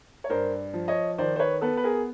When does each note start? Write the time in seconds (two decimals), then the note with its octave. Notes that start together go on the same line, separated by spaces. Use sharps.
0.24 C#5
0.30 G2 A#4 C5
0.74 F3
0.88 C#5 D#5
1.18 D#3 C5 D5
1.36 C5
1.39 B4 C#5
1.61 B3 A4 B4
1.77 B4
1.84 G#4 A#4